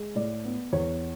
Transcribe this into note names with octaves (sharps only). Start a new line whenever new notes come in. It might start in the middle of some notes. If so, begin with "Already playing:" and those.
Already playing: G#3
A2 D5
B3
E2 C#5